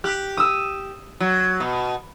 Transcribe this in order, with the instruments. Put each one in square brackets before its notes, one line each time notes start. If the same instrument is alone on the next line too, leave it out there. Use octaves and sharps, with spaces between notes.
[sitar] G4 [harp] F#6
[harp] D#6 E6
[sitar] F#3
B2